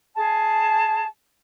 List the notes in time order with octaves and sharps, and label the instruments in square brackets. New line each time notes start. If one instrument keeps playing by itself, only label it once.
[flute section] G#4 A5